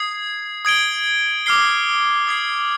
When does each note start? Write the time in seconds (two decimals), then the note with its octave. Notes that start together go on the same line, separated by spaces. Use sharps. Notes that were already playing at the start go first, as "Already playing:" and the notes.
Already playing: D#6 G#6 C7
0.65 D#6 G#6 D7 G7
1.46 D6 F6 C7 G7
2.27 D#6 G#6 C7